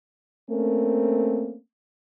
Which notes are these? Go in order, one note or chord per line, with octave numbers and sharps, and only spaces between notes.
A3 A#3 C4 C#4 A#4